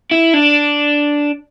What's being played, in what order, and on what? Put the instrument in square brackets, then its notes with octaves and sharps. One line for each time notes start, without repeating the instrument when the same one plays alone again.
[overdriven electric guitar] E4
D4